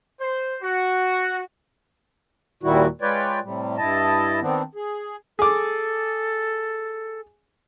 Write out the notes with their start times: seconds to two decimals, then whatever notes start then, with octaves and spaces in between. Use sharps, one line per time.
0.20 C5
0.62 F#4
2.63 D#2 A#2 D#3 G3 E4 F#4
3.02 G#3 F4 B4 C#5 D5 G5
3.43 A2 C3 G3
3.77 G2 E4 D#5 A5
4.41 D#3 B3 C4 D4
4.75 G#4
5.39 G#4 A4 D6